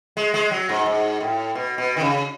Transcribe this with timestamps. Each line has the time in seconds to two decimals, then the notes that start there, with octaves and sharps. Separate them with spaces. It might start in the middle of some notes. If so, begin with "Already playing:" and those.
0.17 G#3
0.34 G#3
0.51 F#3
0.69 G#2
0.86 G#2
1.20 A2
1.55 B2
1.78 B2
1.97 D#3
2.01 C#3